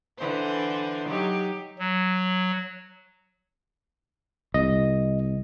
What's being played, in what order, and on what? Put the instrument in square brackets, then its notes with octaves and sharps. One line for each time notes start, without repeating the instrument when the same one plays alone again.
[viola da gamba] D3 E3 C5
F#3 D#4 G4
[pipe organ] F#3
[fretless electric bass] C2 [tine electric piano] D#5